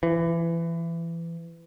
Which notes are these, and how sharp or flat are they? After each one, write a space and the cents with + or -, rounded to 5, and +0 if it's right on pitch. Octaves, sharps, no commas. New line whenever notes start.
E3 +25